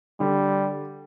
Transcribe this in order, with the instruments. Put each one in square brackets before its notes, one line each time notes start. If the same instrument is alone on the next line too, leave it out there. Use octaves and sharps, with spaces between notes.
[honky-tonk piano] D3 [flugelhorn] G3